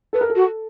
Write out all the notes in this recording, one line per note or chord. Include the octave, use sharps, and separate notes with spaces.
A4 B4
A#4
A4
F#4